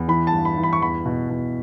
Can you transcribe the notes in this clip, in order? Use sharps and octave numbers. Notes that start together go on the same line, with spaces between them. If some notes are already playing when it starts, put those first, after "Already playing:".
Already playing: E2
E3 B5
A5
G2
B5
E3
B5
C#6
E2 B5
B2
B2